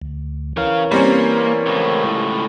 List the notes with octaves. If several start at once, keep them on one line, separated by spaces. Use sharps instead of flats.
D2
E3 C#4 A#4 C#5 F5
G3 A#3 C4 C#4
C#2 A2